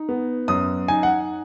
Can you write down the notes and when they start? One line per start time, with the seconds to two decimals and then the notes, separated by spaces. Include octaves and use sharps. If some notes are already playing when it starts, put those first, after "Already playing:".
Already playing: D#4
0.09 B3
0.48 F#2 D#6
0.88 D#4 G#5
1.03 F#5